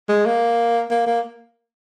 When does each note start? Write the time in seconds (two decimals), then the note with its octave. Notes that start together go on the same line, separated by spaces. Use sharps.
0.09 G#3
0.26 A#3
0.91 A#3
1.07 A#3